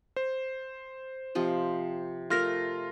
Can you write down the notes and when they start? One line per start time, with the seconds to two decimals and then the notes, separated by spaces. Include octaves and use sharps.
0.16 C5
1.35 C3 F3 D#5
2.30 A3 F4 A#4 F6 A#6